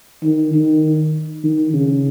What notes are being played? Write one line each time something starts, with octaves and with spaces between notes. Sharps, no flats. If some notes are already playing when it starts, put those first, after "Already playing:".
D#3
D#3
D#3
C#3